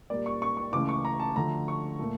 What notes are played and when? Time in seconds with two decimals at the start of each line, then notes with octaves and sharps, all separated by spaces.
0.10 A#2 G3 A#3 D5
0.26 C#6
0.42 C#6
0.57 C#6
0.73 C#2 C#3 E3 A3 D6
0.89 C#6
1.05 A#5
1.20 A5
1.36 D2 D3 F3 A3 A#5
1.68 C#6
1.99 A#2 A3